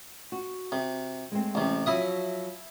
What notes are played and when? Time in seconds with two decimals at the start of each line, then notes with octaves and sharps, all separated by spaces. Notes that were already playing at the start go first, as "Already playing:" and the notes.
0.32 F#4
0.72 C3
1.32 G#3 A3 C4
1.55 A1 C3
1.86 F3 F#3 E4 F#4 E5 D#6